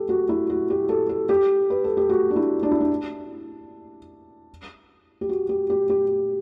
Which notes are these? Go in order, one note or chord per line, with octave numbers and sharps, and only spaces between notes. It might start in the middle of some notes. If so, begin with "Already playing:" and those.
Already playing: G4 A4
F#4
E4
F#4
G4
A4
A4
G4
B4
A4
G4
F#4
D4
E4
D4
E4
D4
G4
F#4
G4
G4
G4